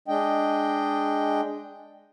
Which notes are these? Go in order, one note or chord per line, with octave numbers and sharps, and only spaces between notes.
G#3 D4 D#5 G5